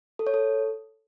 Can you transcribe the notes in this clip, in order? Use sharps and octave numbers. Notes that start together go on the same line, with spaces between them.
A4
C#5
A4